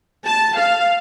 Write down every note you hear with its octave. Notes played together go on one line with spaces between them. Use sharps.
A5
F5